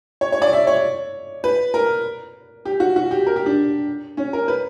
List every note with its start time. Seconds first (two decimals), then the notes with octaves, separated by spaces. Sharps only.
0.21 C#5
0.32 C#5
0.42 D5
0.53 E5
0.67 C#5
1.44 B4
1.74 A#4
2.65 G4
2.80 F#4
2.96 F#4
3.11 G4
3.27 A#4
3.36 G4
3.46 D4
4.17 C#4
4.33 A#4
4.48 B4